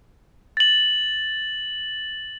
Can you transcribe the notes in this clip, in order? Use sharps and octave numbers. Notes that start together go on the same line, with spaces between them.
A6 F#7